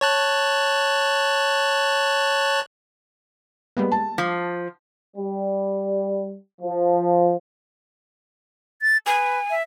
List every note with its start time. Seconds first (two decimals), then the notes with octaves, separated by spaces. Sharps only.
0.01 C#5 A5 F#6
3.77 G3 G#3 A#3 B3
3.92 A5
4.18 F3 D6 B6 C7
5.17 G3
6.62 F3
8.82 A6
9.07 B4 G#5
9.50 E5